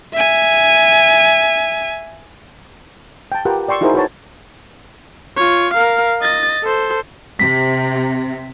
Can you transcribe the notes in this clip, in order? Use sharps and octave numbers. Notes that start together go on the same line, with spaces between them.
E5 G#5
G5 A5
F4 G4 A#4 B4 F#5 G5
D5 G5 C6 C#6 E6
D#4 E4 F#4 G#4 A#4 C5
F#4 B4 C#5 A5
F4 C#5
A#4 F5
D#5 A6
A4 C5
C3 B6